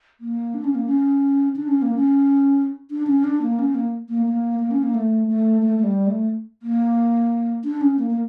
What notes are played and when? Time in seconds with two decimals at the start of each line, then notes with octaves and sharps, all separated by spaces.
0.21 A#3
0.54 D4
0.64 C#4
0.75 A#3
0.86 C#4
1.56 D4
1.68 C#4
1.82 A#3
1.95 C#4
2.91 D4
3.07 C#4
3.24 D4
3.42 A#3
3.59 C#4
3.75 A#3
4.09 A#3
4.26 A#3
4.59 A#3
4.71 C#4
4.83 A#3
4.94 A3
5.27 A3
5.62 A3
5.79 A3
5.84 G3
6.07 A3
6.63 A#3
7.64 D4
7.81 C#4
7.99 A#3
8.10 A#3